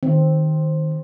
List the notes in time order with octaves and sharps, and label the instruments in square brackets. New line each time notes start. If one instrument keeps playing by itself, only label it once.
[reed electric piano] D#3 [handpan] C4